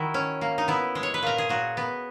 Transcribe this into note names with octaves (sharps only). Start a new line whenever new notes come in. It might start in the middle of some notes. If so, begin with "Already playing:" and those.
Already playing: D#3 E4 F#4
C#4
A#3
D#4
B3 E4
G#3
C#5
B4
A#2 A#4
G#4
A#2 F#4
B3